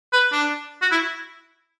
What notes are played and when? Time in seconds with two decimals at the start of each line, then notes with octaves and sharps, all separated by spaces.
0.13 B4
0.32 D4
0.82 F#4
0.91 E4